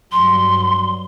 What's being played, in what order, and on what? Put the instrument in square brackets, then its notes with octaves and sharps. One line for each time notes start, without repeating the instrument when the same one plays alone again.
[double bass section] G2 F#3 [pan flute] C6